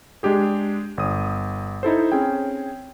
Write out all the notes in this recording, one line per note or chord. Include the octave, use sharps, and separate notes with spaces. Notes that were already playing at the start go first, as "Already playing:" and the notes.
G#3 D4 G4 G#4
G1 D#6
D#4 E4 A4 C5
C4 C#4 G#4 G5